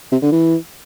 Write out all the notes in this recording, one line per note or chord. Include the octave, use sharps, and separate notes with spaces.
C3
D3
E3